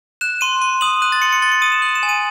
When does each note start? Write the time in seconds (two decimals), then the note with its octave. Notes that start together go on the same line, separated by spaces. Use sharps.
0.21 F#6 E7
0.41 C6 D#7
0.62 C6
0.81 D#6 F#7
1.02 F#6 D#7
1.12 A6
1.22 C6 C#7
1.32 C#7
1.42 C6 A6
1.52 C#7
1.62 D#6 D#7
1.72 E7
1.82 F#6 F#7
1.95 E7
2.03 G#5
2.09 D#7